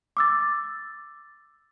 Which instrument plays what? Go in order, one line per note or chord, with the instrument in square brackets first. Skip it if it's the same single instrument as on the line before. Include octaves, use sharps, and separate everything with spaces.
[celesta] D6 E6 A6